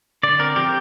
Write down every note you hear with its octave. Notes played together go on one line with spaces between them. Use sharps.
D3 D5
C4 A#4
F3 G4